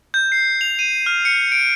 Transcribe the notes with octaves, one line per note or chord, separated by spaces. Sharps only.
G6
C7
F7
D#7
F6
C#7
D7